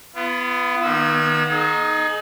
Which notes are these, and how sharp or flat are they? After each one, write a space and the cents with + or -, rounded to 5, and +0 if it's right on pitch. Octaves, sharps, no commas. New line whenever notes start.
B3 +15 F4 -35
D#3 -15 B3 -40 E6 -20
D#4 -5 G#4 +35